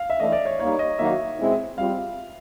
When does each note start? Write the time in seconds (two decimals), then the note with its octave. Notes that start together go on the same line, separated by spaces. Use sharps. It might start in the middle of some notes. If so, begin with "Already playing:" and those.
Already playing: F5
0.10 E5
0.19 E3 A3 D4 D#5
0.32 D5
0.45 C#5
0.60 G3 A#3 D#4 C#5
0.79 D#5
0.98 D#3 F#3 A#3 D#4 F#4 E5
1.39 B2 G#3 C4 E4
1.78 G3 C4 F4 F5